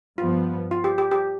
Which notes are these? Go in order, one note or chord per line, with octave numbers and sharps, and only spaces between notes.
G2 F3 B3 F4
F4
G4
G4
G4